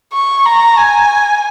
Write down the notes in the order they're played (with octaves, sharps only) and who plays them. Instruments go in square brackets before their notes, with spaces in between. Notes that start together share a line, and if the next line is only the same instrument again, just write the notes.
[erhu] C#6
A#5
G#5